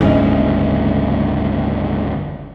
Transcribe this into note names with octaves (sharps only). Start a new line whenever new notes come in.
F#1 D2 G#2 E3 C#4 D#5